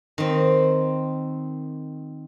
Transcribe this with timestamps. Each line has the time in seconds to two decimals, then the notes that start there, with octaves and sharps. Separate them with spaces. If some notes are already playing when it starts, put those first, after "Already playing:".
0.18 D#3 C4